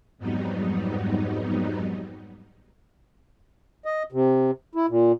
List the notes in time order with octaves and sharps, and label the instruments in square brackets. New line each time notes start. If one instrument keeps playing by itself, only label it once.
[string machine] F2 G#2 F#3 G3 B3 D#4
[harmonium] D#5
C3
E4
A#2